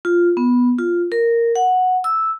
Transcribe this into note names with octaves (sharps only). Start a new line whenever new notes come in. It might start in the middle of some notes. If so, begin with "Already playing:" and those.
F4
B3
F4
A#4
F#5
E6